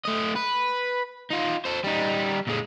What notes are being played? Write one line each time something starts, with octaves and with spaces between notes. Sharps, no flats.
A3 D#5
B4
D#4 F4
A4 C5
G3 D#4
A#2 G#3